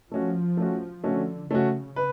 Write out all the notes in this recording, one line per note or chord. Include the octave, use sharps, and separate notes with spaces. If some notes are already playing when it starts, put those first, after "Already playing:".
F3 A3 C#4 F#4
A3 C#4 F#4
D3 A3 C#4 F#4
C#3 A3 C#4 F#4
B4